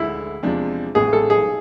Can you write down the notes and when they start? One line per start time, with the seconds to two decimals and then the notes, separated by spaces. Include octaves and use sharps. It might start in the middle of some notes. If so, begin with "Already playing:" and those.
Already playing: D2 D3 G#3 E4
0.43 E2 C3 F3 G#3 D4
0.95 A1 A2 G#3 B3 G#4
1.13 A4
1.30 G#4